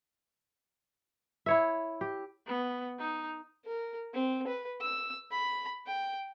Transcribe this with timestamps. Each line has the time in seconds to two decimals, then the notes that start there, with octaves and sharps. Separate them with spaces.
1.46 E4 C#5 E5
2.01 G4
2.47 B3
2.99 D#4
3.65 A#4
4.14 C4
4.47 B4
4.81 E6
5.31 B5
5.86 G5